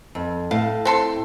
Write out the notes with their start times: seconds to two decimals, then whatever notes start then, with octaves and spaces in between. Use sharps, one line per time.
0.15 F2
0.51 A2 F5
0.85 C4 A4 C6